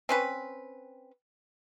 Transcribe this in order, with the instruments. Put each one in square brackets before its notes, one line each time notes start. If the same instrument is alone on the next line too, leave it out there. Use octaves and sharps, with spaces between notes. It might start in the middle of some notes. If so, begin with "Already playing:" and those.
[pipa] C4 C#4 B4